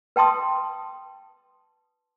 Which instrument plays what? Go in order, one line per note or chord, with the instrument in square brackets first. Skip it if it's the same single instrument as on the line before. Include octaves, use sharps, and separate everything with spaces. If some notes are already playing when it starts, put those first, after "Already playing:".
[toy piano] B4 G5 A5 C6 D#6